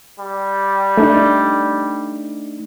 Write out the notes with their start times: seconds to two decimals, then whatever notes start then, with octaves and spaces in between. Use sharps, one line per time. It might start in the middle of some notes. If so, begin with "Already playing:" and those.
0.20 G3
0.97 A3 D4 D#4